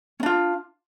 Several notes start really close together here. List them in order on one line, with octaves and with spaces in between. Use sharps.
C#4 D4 F4